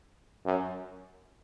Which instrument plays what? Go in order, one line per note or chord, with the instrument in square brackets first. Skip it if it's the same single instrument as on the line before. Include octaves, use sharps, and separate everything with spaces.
[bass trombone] F#2